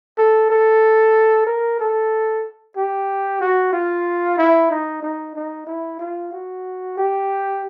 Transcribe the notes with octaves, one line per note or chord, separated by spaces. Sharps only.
A4
A4
A#4
A4
G4
F#4
F4
E4
D#4
D#4
D#4
E4
F4
F#4
G4